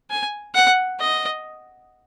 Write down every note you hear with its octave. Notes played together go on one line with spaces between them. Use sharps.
G#5
F#5
D#5